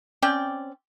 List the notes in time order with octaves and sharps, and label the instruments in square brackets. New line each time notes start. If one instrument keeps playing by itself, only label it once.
[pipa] C4 C#4 D5 G5